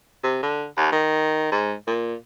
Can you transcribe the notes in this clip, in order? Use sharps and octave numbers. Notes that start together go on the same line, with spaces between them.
C3
D3
D#2
D#3
G#2
A#2